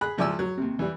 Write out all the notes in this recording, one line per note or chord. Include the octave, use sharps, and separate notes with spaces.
G#4 B5 F#6
C#2 F3 E4 D5 G#5 E6
F#3
D#2 C3
E3 G3